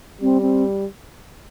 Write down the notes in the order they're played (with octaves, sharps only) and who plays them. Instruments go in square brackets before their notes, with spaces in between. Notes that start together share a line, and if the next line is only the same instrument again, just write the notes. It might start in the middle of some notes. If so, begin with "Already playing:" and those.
[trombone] G3 [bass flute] C4
[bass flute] C4